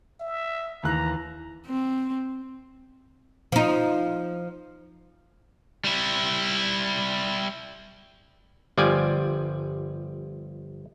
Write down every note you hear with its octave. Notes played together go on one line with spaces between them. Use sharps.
E5
D#2 E3 A#5 F#6
C4
F3 D#4
G3 E4
G1 F3 G3 D5 G#5